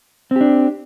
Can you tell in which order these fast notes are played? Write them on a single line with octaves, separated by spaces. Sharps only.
C4 G4 D4